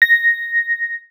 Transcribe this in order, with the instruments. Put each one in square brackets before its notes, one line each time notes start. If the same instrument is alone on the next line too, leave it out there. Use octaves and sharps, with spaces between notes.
[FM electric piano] A#6